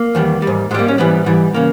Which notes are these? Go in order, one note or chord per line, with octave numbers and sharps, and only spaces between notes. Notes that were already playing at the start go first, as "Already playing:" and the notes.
Already playing: A#3
E2 D#3 G3
G#2 G3
G#2 G3 G#3 A#3
C#4
G#2 E3 G3 B3
G#2 E3 G3
C#3 A#3